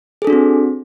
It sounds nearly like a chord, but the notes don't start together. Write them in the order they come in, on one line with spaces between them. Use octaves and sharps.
G#4 A4 D4 F#4 C4